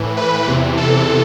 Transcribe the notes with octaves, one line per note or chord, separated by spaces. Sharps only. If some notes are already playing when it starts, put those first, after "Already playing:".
Already playing: A2 E3
B4
E2 C3 E3
A4